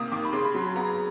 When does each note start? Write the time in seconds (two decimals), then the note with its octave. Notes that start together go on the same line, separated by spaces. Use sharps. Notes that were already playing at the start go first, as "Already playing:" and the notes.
Already playing: C3 D#3 A#3 D#6
0.12 D#3 D6
0.25 B5
0.33 C#3 C6
0.45 B5
0.54 F#3 C6
0.76 B3 A#5